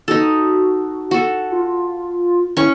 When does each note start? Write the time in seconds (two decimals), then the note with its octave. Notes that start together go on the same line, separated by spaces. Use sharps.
0.08 D#4 F#4 A4
1.11 F#4 A4
1.52 F4
2.57 C#4 E4 C#6